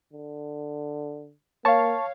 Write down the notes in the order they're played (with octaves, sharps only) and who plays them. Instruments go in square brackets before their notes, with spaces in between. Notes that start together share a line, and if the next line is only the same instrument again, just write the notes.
[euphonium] D3
[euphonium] A#3 [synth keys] C#5 F5 [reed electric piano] A5 C#6